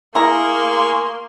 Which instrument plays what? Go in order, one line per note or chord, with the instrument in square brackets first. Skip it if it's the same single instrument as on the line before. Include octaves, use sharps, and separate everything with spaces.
[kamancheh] A#3 C6 [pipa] E4 A#5 [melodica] G#4 A#4 C#6